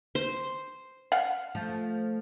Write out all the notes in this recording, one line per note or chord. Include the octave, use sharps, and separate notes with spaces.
C5
F5 F#5
F3 A3